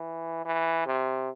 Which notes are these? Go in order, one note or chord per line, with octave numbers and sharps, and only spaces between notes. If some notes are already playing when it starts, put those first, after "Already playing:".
Already playing: E3
E3
C3